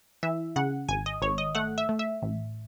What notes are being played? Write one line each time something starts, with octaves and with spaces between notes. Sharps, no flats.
E3 E5
C#3 F#5
G#1 G#5
D#5
G#1 C#5
D#5
A3 F#5
E5
A3
E5
A1